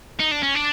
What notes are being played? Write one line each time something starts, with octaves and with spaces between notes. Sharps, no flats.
D#4
D4
C#4
D4